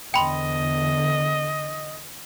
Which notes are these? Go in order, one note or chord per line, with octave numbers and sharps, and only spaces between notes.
E2 D3 D#5 G5 B5 C6